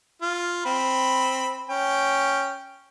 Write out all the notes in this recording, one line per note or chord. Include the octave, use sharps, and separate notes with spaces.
F4
C4 B5
C#4 G5